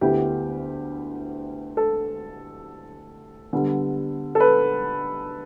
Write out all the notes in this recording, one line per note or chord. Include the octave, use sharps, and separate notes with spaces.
D2 D3 B3 E4 G4
A4
D3 G3 B3
A4
B4